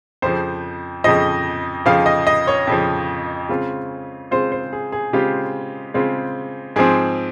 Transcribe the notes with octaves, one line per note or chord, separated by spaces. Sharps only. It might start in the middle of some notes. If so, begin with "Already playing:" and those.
F2 C#3 F3 C5
F2 C#3 F3 D#5
F2 C#3 F3 F5
D#5
D#5
C#5
F2 C#3 F3
C#3 G#3 C4 F4
C#3 G#3 C4 F4 C5
C5
G#4
G#4
C#3 G#3 C4 F4 G4
C#3 G#3 C4 F4
G#2 F3 C4 G#4